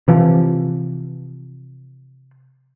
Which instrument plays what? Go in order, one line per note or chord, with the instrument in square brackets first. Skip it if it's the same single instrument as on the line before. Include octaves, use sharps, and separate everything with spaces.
[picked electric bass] C3 E3 F3